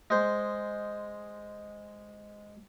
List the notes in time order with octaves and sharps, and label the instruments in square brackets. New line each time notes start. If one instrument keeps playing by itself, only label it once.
[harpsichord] G#3 C5